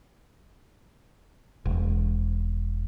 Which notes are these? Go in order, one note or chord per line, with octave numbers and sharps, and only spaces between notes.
E1